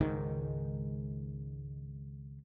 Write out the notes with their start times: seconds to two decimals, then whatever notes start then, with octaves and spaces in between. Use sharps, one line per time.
0.01 C#2 G#2 D#3